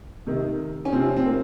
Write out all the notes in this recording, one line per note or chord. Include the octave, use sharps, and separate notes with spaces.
C3 D#3
C#4
C3 F3 C4
C4
A#3